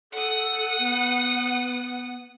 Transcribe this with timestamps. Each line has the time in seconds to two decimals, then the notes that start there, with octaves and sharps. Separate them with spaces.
0.13 A4 F#5 D#6
0.79 B3